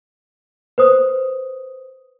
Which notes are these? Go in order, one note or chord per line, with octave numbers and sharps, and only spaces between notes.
B4 C5 D#6